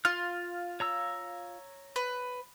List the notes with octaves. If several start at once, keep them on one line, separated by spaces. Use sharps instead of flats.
F4 F6
C#5 A#5 E6
B4